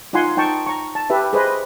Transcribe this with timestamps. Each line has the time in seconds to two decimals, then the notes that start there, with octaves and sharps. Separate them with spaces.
0.13 D#4 F4 F#5 G#5 C6
0.37 D#4 G5 A5 C#6
0.67 A#5 C#6
0.95 A5
1.10 G4 B4 E5
1.33 G#4 B4 C5 D#5